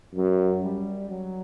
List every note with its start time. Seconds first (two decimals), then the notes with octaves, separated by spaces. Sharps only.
0.15 F#2 F#3
0.63 G3
1.09 F#3